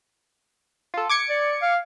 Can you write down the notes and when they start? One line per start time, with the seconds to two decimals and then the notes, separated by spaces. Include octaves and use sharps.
0.94 F4 A4
1.09 D6 G#6 C#7
1.29 D5
1.62 F5